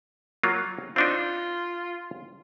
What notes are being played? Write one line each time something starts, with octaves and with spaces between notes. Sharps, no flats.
F#3 A#3 F4
C4 D4 D#4 F4